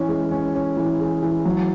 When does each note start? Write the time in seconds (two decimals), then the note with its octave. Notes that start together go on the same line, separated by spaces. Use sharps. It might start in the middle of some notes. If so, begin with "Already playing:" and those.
Already playing: E3 C#4
0.08 G#3
0.31 C#4
0.55 C#4
0.77 E3
0.99 G#4
1.23 E3
1.45 F#3